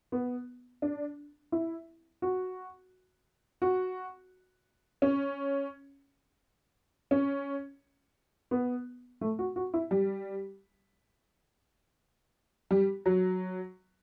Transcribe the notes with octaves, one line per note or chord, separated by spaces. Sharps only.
B3
D4
E4
F#4
F#4
C#4
C#4
B3
A3
F#4
F#4
E4
G3
G3
F#3